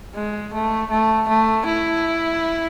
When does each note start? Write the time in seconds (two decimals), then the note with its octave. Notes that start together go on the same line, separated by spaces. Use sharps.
0.15 G#3
0.53 A3
0.90 A3
1.28 A3
1.66 E4